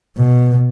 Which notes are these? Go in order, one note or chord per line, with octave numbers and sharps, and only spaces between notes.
B2